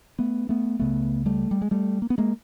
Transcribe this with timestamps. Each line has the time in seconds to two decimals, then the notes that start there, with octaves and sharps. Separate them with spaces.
0.19 A3 B3
0.49 A3 B3
0.79 C#2 C#3 A3 B3
1.26 G3 A3
1.51 G3
1.62 G#3
1.71 G3 A3
2.02 A#3
2.10 B3
2.18 G#3 A#3